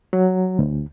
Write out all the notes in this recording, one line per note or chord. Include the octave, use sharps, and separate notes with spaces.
F#3
D2